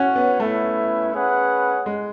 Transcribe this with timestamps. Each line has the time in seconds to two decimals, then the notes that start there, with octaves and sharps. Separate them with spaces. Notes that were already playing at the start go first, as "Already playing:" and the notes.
Already playing: C#4 F#4 C#5 F#5
0.15 B3
0.40 A3 C#4 E4 B4 E5
1.13 C#4 G#4 B4 F#5
1.86 G#3